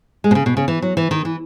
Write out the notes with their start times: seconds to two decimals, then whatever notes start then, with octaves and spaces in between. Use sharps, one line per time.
0.24 G#3
0.31 B2
0.35 C#3
0.46 B2
0.57 C#3
0.68 E3
0.82 F#3
0.97 E3
1.11 D#3
1.25 E3